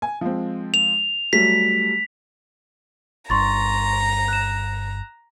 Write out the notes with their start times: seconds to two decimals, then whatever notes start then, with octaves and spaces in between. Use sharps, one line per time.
0.02 G#5
0.21 F3 G#3 C4
0.74 F7
1.33 F#3 G3 A3 B6
3.30 G1 G2 A#5 C6 C#6 A6
4.28 F#6 E7